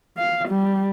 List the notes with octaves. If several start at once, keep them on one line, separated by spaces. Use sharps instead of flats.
F5
G3